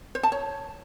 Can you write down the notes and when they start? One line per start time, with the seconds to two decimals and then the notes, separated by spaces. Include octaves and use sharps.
0.15 C5
0.23 A5
0.32 C#5